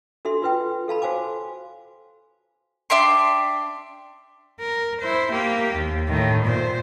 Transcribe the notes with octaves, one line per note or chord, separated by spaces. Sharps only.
D4 F#4 A4 E5 C6
F4 F#4 B4 E5 G5
A4 F5 A5 B5
F#4 C5 F5 G#5 D6
D4 E5 G5 C6
A#4
E4 C5
A#3 G4
D#2
A2 D#3
A#2 C5